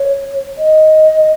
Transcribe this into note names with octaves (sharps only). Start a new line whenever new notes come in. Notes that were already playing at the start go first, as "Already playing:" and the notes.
Already playing: C#5
D#5